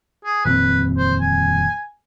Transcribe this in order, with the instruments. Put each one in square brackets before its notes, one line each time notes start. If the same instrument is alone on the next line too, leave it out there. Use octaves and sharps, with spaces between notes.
[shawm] G#4
[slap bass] D#1 F2 C4 [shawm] B4
[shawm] C5
G#5